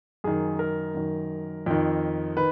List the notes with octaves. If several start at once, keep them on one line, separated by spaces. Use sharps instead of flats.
F#2 D#3 G#4
A#4
F#2 D#3
F2 D#3
D#3 B4